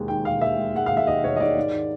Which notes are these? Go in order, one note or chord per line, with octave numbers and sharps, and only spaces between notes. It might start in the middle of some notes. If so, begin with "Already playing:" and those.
Already playing: E1 D#2 G#3
D#3 G5
E1 F5
D#2 E5
G#3
G#3 F#5
D#2 F5
E5
D#2 D#5
E1 C#5
D#5
D#3 D5
G#2
D#3